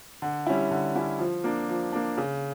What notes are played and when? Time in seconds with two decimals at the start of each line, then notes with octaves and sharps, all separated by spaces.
0.22 D3
0.46 G3 C#4 E4
0.71 D3
0.95 G3 C#4 E4
1.19 F3
1.44 A#3 D4
1.69 F3
1.92 A#3 D4
2.18 C#3